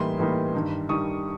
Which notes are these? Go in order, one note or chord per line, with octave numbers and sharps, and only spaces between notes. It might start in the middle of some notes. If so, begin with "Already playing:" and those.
Already playing: A2 E3 G3 A#3 D#4 C6
A2 E3 G3 A#3 D#4
G2 D#3 G3
G2 D#3 G3 C#6 D#6